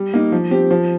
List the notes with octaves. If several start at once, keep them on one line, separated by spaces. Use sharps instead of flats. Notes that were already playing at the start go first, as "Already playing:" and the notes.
Already playing: G3
A#3 D#4
F3
C4 G4
F3